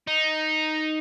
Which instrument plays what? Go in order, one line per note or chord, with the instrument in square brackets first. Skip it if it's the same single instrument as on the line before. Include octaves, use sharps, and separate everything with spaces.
[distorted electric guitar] D#4